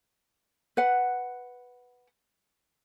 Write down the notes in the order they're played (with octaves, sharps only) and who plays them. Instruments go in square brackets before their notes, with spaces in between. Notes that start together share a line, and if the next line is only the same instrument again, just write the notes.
[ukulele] B4 F#5